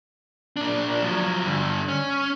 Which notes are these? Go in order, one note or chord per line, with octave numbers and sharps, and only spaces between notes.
A#2 D4
F3 F#3
G2 D3
C#4